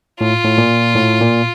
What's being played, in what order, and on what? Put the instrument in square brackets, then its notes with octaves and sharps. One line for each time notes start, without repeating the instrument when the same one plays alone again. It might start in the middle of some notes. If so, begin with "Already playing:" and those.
[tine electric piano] A2 [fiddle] F4
[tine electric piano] A2
A#2
A2
A#2